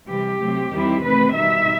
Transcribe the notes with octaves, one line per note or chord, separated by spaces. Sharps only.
C3 E3 G3 G4
C3 F#3 A3 C4
E2 D#3 G3 C4 E4
C3 D#3 A3 C4 B4
B2 G3 D#4 E5